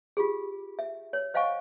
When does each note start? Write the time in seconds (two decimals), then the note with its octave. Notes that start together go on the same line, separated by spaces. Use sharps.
0.17 F4 G4 G#4
0.79 E5
1.13 C#5
1.34 C5 D#5 F5 F#5 G#5 C#6